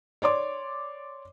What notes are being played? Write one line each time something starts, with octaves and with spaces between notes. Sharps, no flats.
C#5 D5 C6 D6